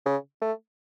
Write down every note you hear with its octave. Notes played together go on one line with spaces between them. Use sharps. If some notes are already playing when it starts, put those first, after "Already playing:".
C#3
A3